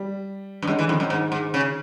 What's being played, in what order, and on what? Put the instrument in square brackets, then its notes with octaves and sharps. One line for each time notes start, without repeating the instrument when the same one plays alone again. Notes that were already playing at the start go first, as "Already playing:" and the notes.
Already playing: [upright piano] G3
[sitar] G2
[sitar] F#2 [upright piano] G#3
[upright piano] D3 [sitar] E3
[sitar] F2 [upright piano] D#3
[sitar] F#2 [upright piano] D#3
[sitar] G#2
G#2
C#3